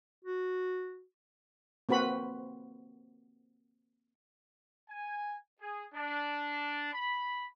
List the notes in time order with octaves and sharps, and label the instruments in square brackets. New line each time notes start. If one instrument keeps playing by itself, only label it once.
[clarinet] F#4
[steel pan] A#3 C4 F#4 B4 B5
[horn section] G#5
G#4
D4
B5